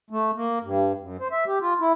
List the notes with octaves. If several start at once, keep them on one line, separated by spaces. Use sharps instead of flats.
A3
A#3
G2
F#2
C5
E5
G4
F4
E4